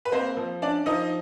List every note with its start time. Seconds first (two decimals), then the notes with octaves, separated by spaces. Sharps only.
0.05 B4
0.12 A#3 C4 C5
0.37 F3
0.62 C#4 D4 D5
0.86 F3 D#4 D#5